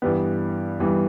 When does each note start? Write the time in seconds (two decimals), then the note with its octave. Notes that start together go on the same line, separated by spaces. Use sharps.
0.02 G2 E3 G3 B3
0.80 G2 E3 G3 B3